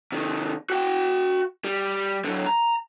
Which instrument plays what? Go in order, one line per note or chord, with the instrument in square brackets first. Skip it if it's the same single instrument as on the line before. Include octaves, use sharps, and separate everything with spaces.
[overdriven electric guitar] C3 D#3
F#4 G5
G3
D3 F#3
A#5